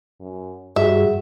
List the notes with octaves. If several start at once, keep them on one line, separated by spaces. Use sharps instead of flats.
F#2
G2 F#4 G#4 E5